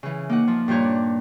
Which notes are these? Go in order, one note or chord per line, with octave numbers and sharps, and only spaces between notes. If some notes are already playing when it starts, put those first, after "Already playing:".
C#3 E3
A#3 D#4 F#5
F3
G2 A#2 C5 C#5 A#5
D4